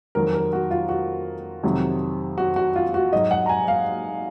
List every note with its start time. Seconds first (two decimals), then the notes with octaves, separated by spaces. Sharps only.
0.15 F2 D#3 F#3 A#4
0.34 A#4
0.53 F#4
0.71 F4
0.89 F#4
1.63 F2 C3 D#3 F#3
2.38 F#4
2.56 F#4
2.76 F4
2.94 F#4
3.13 G#2 F#3 D#5
3.31 F#5
3.46 A#5
3.49 G#5
3.68 F5